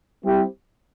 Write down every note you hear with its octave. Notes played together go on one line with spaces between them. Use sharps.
G3 C4 E4 G4